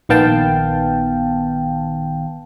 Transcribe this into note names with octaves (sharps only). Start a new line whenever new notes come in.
A#1 D#3 B3 F5 G5 A5